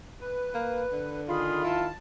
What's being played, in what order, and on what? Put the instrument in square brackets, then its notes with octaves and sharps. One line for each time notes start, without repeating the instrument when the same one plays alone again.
[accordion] B4
[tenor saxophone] A#3
D3
[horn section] D#3 F4 [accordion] G#4 B5
[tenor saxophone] E4 [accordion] A5